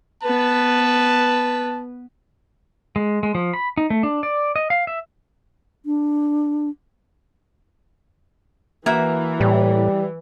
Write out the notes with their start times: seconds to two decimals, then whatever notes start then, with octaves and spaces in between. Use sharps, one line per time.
0.23 B3 B4 A5
2.96 G#3
3.23 G#3
3.35 F3
3.54 B5
3.77 D#4
3.90 A3
4.03 D4
4.23 D5
4.56 D#5
4.70 F5
4.87 E5
5.86 D4
8.86 E3 A#3 F#4 E5
9.40 A2 G3